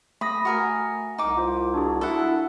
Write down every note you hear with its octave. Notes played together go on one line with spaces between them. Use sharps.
A3 B5 D#6 A#6
F#4 A#4 G#5
C2 D#4 D6
F4 C5
D4 F#4 G#4
E4 A4 F#5